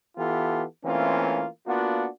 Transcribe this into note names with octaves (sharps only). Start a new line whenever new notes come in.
E3 B3 F4 G4 A4
E3 A3 A#3 C4 C#4 F4
A#3 B3 D4 F4 F#4